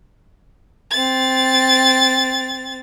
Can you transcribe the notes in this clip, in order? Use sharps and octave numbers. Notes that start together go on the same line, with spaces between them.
C4 A6